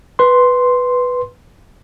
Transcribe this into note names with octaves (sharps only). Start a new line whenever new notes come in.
B4 C6